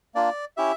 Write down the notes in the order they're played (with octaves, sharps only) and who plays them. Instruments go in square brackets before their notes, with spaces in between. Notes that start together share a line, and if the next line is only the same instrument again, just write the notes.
[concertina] A#3 D4 F4 D5
C#4 E4 G4 E5